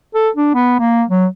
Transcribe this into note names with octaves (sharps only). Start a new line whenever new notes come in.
A4
D4
B3
A#3
F#3